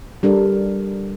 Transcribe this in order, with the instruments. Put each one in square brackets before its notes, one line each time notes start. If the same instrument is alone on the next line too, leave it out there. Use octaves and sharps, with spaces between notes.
[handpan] G3 D4 A4 A#4